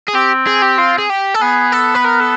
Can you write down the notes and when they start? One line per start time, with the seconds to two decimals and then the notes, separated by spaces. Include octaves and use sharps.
0.08 G#4
0.14 C4 G4
0.47 G#4
0.62 G4
0.78 F4
0.98 G#4
1.10 G4
1.35 A4
1.41 B3 G#4
1.73 A4
1.95 B4
2.05 A#4
2.20 A4